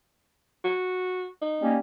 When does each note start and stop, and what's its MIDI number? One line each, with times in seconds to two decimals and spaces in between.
0.64 1.28 66
1.41 1.74 63
1.61 1.77 55
1.61 1.77 58
1.61 1.77 61